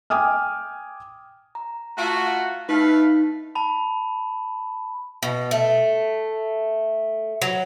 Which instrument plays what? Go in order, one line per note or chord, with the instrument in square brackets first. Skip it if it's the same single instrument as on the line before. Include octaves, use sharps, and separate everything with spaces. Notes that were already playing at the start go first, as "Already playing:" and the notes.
[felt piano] G5 G#5 D6 D#6 F6
[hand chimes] A#5
[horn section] A3 F4 F#4
[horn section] A3 B4 F5 [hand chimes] D#4
[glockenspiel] A5 B5
[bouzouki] B2
A3
F#3